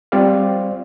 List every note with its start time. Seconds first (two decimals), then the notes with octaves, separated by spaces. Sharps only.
0.12 G3 C4 F4 C5 D5 F5